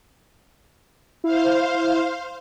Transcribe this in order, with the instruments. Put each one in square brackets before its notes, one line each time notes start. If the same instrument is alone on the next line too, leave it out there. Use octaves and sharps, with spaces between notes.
[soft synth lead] E4 [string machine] C5 F5